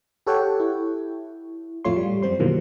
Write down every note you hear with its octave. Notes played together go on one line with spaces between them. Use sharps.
G4 A4 C#5 F#5 G5
E4
F2 A2 A3 F4 C#5 C6
G3
F#2 G3 C4 C5 C6
B2 D#3 E3 F#3 A#3